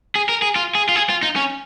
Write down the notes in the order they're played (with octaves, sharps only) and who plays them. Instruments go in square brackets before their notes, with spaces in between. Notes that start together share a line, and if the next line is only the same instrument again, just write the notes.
[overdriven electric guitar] G#4
A#4
G#4
F4
G#4
F4
G#4
F4
D#4
C#4